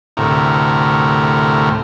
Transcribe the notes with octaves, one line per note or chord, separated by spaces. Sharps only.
D2 A2 C3 A#4